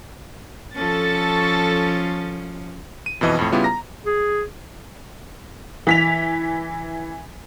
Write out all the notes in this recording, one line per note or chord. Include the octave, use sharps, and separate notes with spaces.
F3 C#4 A4 C#6 A6
D#7
F2 B2 E3 D#5
F2 A2
C#3 G3 B3 E4 F4 G4
A#5 A#6
G#4
E3 B6 F7